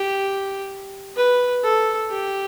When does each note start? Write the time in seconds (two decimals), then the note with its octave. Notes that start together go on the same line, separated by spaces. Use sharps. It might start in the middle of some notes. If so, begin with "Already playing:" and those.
Already playing: G4
1.16 B4
1.64 A4
2.10 G4